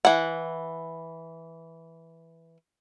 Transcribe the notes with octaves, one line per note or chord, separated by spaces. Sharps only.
E3 F#5